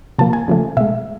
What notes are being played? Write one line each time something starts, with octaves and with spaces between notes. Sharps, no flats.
C3 F3 A#3 A5
G#5
C#3 F3 A3
B2 G#3 E5